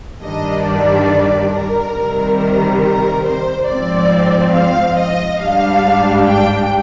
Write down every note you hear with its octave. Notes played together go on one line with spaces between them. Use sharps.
G2 D#3 G3 D4 D#5
D5
A#4
C3 D#3 G3
A#4
A#4
C5
G#2 F3 C4 D5
F5
D#5
G#2 G3 D4 F5
G5